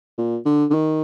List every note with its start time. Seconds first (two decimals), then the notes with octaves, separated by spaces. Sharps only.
0.18 A#2
0.45 D3
0.70 D3
0.74 D#3